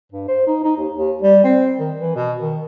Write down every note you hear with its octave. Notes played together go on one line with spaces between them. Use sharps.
G2
C5
D#4
D#4
D#2
D#2
G3
C4
D#3
E3
B2
D#3